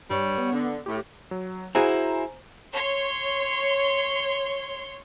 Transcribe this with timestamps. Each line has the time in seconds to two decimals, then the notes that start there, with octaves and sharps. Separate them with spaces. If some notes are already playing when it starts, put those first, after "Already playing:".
0.10 G2 G3 C#5
0.38 B3
0.53 D3
0.86 A2 G4
1.31 F#3
1.75 E4 F#4 G#4 C5 G#5 A#5
2.73 C#5 C6